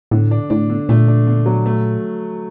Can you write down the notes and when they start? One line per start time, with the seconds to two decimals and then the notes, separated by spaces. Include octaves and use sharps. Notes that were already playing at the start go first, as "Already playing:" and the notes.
0.11 A2 D3
0.31 D4
0.50 A2 D4
0.70 D3
0.89 A#2 A3
1.08 D4
1.27 D3
1.46 F#3
1.66 A3